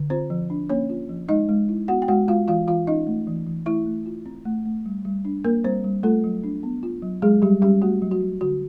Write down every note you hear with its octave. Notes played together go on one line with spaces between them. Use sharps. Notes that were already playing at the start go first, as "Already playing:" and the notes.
Already playing: D3
C4 F4 C5
F3
D4
A#3 C#4 C#5
F4
F3
G#3 D#4 D#5
G#3
E4
B3 F#4 F#5
G5
G#3 F#4 F#5
G#3 F4 F5
E3 F4 F5
E3 F4 F5
C#4 D#4 D#5
A3
E3
E3
A3 E4 E5
A3
F4
C4
A3
A3
G3
G3
D4
A#3 A#4
G3 C4 C5
G3
A3 F4 A4
F#3
D4
B3
F4
F#3
F#3 G#3 G#4
F#3 G3 G4
G3 C#4 G4
A3 F#4
F#3
F#4
F#3
D3 F#4